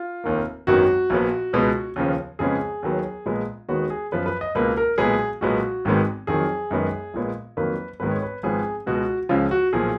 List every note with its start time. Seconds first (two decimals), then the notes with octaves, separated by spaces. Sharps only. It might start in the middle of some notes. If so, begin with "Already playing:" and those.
Already playing: F4
0.24 F1 D#2 D#3 A#3
0.67 G#1 F#2 D#3 F#3 B3 F#4
1.10 A#1 A#2 F3 B3
1.53 C#2 B2 G#3 B3
1.96 D#2 C#3 F3 B3
2.39 F2 C#3 G#3 B3 G#4
2.83 D#2 D#3 F#3 B3
3.26 A#1 A#2 G#3 B3
3.68 D#2 D#3 G#3 B3 F#4
3.90 G#4
4.12 F#2 F3 B3 B4
4.26 B4
4.41 D#5
4.55 C#2 B2 A#3 B4
4.77 A#4
4.98 B1 A#2 G#3 B3 G#4
5.41 B1 A#2 G#3 B3 F#4
5.85 G#1 G#2 D#3 G#3 B3
6.27 F2 D#3 F#3 G#4
6.71 F#2 D#3 G#3 B3
7.14 A#1 A#2 G#3 B3
7.57 F2 D#3 F#3 A#3 B4
8.00 G#1 G#2 D#3 G#3 B3 B4
8.11 C#5
8.23 B4
8.43 G#1 G#2 F3 B3 G#4
8.86 C#2 B2 G#3 F#4
9.29 C#2 C#3 F3 F4
9.51 F#4
9.73 B1 A#2 F3 G#4